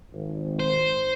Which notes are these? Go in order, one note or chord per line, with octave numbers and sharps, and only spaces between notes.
G#1
C5